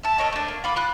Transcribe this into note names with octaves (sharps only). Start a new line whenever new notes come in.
E5 A5
A4 A#4 C#5 D#5
A3 D4
A#3
F4 B5 D6
F4 B5 F#6